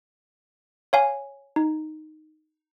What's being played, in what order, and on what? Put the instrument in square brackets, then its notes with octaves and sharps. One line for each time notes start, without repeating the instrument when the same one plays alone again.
[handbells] C#5 F5 G#5
D#4